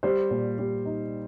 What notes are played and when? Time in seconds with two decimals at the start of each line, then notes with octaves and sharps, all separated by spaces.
0.03 G3 C5
0.31 A#2
0.58 G3
0.85 D#4